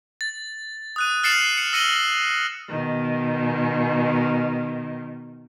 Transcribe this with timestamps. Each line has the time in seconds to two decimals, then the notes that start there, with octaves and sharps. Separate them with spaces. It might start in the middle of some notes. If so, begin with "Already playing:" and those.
0.21 A6
0.96 D#6 F#6 D#7
1.23 F6 A6 C7 C#7 E7 F#7
1.57 C#7
1.73 E6 A#6 C#7 D#7 F#7 G7
2.69 B2 D#3